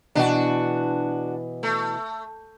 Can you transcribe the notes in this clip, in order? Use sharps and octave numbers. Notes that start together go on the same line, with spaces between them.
B2 E3 D4 F#4
A3